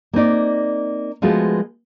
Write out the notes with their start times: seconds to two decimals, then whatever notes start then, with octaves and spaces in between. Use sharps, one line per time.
0.13 A#3 C4 D#4 D5
1.22 F3 G#3 A3 B3 F4 F#4